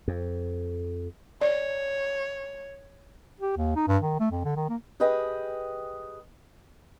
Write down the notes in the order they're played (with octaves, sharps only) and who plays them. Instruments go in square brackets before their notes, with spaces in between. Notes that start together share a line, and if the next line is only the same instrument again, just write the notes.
[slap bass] F2
[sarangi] C#5 [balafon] D5
[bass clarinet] G4
D#2
D#4
G2
D#3
A3
F2
D3
D#3
A#3
[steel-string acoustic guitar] G4 G#4 B4 D#5 G5